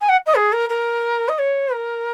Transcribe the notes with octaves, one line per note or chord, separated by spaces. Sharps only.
G#5
F#5
D#5
G#4
A#4
A#4
D#5
C#5
A#4